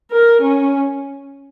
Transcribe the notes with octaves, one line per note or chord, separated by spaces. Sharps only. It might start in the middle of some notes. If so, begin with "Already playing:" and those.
A#4
C#4